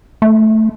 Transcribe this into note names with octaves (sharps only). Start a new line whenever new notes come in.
A3